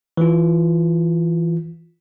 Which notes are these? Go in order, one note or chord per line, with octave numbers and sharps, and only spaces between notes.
E3 F4